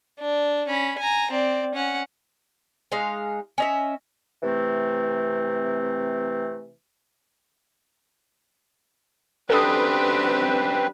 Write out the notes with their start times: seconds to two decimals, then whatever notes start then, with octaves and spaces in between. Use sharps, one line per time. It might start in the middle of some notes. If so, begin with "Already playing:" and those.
0.20 D4
0.68 C#4 B5
0.99 G#5 A#5
1.31 C4 D5
1.75 C#4 F#5
2.92 G#3 D#4 F5
3.58 C#4 D#5 E5
4.43 C3 E3 A3 C4
9.50 F#2 C4 D4 G4 A4 B4 D#6